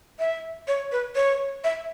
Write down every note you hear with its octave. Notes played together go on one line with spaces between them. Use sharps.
E5
C#5
B4
C#5
E5